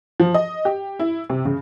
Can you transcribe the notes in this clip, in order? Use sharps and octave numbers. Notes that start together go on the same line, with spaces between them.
F3
D#5
G4
E4
C3
C#3